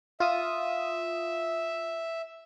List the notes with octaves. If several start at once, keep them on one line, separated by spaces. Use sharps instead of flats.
F4 E5 D#6